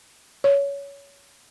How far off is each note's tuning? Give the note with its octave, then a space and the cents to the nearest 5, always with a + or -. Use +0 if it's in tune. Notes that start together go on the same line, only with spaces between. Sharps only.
C#5 +20